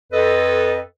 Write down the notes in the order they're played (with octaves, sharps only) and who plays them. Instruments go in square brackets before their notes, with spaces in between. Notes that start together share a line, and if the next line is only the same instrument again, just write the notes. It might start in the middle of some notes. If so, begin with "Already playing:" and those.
[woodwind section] F2 A4 B4 D#5